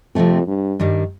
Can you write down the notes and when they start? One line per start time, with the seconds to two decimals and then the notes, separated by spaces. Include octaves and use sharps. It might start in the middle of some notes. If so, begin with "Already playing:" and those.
0.15 F2 C3 F3 A3 C4
0.47 G2
0.80 G2 D#3 G3